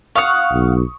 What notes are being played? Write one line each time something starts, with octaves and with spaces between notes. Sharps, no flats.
F5 F#5 C#6 D#6
B1